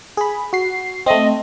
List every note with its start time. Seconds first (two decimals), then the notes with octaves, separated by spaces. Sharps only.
0.17 G#4 B5
0.53 F#4 C7
1.06 A3 C4 D#5